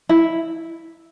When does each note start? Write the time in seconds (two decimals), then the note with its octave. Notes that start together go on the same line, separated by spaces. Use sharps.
0.09 E4